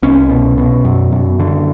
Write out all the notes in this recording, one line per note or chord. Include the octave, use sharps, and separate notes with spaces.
C2 C#4
B2
B2
F#2
F#2
D3